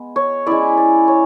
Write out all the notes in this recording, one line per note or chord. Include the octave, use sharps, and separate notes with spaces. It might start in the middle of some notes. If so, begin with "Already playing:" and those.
Already playing: G#3 B3
C#5
G#3 C#4 E4 D5
D5
C#5